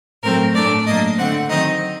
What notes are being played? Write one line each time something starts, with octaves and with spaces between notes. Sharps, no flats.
A2 F#3 A3 C4 A#4
A2 A3 D4 D5
A2 F#3 A#3 D4 D#5
D3 A3 C4 F#5
D#3 F#3 C4 D#4 D#5